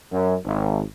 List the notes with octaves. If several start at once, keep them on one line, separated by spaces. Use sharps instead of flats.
F#2
G#1